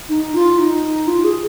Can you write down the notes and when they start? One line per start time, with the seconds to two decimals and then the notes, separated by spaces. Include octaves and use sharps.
0.09 D#4
0.35 F4
0.58 D#4
1.07 F4
1.24 G#4